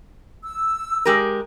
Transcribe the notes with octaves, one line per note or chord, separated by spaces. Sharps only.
E6
G#3 G4 A#4